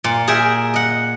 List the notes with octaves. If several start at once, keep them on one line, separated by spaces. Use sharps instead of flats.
A#2
G#4 A#4 E5 G5 G#5
D#5 F#5